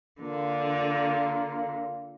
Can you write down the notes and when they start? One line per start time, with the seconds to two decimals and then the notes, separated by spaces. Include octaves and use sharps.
0.21 D3 A#3 F4